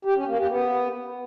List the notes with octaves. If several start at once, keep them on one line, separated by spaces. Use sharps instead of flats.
G4
C#4
A#3
G4
B3